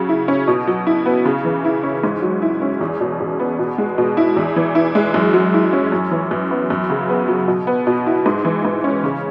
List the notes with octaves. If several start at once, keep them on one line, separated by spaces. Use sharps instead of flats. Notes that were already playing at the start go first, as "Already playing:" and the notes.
Already playing: C#3 F#3
E4
C#4
B2
F#3
E4
B3
C#3
E3
E4
C#4
G#2
F#3
E4
C#4
E2
B2
E2
B3
B2
G#3
B2
E4
E2
E3
E4
G#3
F#2
F#3
E4
C#4
F#2
E3
F#2
B3
F#2
C#3
B3
F#3
B2
B3
B2
E4
G#2
E3
G#2
C#4
C#3